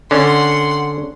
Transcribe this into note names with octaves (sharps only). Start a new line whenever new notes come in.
D3 C#4 F#5 C6